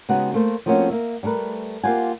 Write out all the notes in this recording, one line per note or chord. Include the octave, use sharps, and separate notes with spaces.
C#3 G#3 B3 D#4 F#4 G4
A3 A#3 C5
F3 A3 A#3 C4 C#4 F#4
A#3 E5
G3 A3 A#4 B4
A#3 F4 G4 C5 F#5 G#5